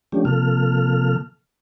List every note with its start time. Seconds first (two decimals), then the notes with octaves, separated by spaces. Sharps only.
0.12 F3 A3 C#4 D4 G4
0.25 C3 F3 A#3 A4 F6